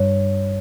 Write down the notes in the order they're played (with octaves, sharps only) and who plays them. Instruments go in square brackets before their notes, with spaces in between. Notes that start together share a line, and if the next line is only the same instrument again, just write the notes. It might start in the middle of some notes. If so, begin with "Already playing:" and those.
Already playing: [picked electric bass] G2 [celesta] C#5